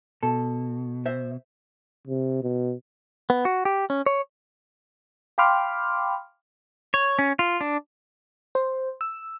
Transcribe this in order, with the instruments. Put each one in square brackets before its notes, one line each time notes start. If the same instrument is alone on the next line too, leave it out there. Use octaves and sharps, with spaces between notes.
[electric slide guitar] B2 [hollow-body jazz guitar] A4
[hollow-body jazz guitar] C5 E5
[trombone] C3
B2
[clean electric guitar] B3
F#4
G4
C#4
C#5
[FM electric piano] F5 G5 B5 C6 D6 F6
[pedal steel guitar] C#5
C#4
F4
D4
[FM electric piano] C5
E6